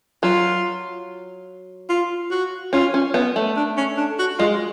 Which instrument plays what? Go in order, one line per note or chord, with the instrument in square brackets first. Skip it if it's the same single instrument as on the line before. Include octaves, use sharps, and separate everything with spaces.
[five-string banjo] F#3 [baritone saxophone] F4
[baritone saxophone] F4
F#4
[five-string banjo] C#4 [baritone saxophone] F4
[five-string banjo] C#4
B3
A3
[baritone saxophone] D4
C#4
D4
F#4
[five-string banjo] G#3 [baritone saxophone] F4